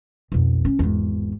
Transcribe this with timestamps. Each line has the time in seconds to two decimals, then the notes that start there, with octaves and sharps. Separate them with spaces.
0.32 B1 F2
0.65 C#4
0.79 G#1 E2